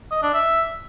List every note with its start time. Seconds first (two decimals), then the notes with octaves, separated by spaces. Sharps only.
0.11 D#5
0.23 D4
0.34 E5